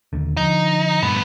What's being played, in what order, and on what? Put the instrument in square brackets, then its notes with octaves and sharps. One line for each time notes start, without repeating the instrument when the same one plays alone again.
[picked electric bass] D#1 D#2 D3
[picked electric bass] D3 F3 [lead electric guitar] D#4
[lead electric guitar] D2 B3 [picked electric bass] G2 A#2